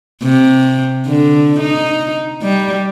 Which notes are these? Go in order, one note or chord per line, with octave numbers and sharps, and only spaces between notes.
C3
D3
D#4
G3